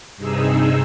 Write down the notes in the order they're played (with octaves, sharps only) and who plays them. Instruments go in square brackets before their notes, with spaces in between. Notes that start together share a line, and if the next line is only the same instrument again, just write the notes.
[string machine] G2 C3 D#4 G#4 E6